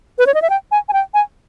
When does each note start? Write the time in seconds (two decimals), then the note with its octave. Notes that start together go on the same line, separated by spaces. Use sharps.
0.19 B4
0.27 C#5
0.34 D#5
0.42 E5
0.50 G5
0.72 G#5
0.89 G#5
0.93 G5
1.14 G#5